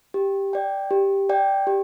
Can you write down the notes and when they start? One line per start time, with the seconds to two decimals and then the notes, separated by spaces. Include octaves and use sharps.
0.14 G4
0.53 D5 G5
0.91 G4
1.29 D5 G5
1.67 G4